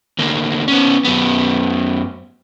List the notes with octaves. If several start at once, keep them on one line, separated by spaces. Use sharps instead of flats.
D2 A#3
B3 C#4
F#2 B3